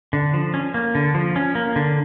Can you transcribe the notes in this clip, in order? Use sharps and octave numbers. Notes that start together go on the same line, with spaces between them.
D3
F3
C#4
A#3
D3
F3
C#4
A#3
D3